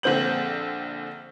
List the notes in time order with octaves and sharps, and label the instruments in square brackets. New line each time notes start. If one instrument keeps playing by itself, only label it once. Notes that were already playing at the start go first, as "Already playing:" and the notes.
[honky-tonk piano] A#1 D3 C4 G6 F#7